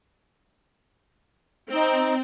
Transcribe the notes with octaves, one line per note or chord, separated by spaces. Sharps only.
C4 D#4